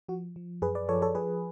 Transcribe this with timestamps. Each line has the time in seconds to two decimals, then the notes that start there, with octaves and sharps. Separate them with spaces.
0.08 F3 F#4
0.36 F3
0.62 F#2 G#4 B4
0.75 B4 D5
0.89 F3 A4 C#5
1.02 A4 C#5
1.15 F3 G#4 B4